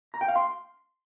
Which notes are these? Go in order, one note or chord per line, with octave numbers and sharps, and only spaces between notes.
A#5
G5
F5
C6